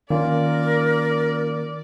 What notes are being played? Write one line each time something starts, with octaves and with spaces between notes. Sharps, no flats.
D#3 A#3 C#4 F4 A#4 D5